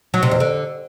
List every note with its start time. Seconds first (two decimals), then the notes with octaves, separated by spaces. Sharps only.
0.14 F#3
0.23 C3
0.31 E2
0.40 D3